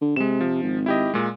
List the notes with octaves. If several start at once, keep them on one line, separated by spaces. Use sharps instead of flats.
D3
C3 G#3 E7
F3
G#1
E4 G4 D#5
A#2 G#3